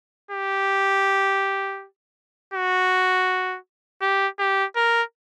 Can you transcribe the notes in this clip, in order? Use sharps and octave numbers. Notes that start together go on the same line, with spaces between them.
G4
F#4
G4
G4
A#4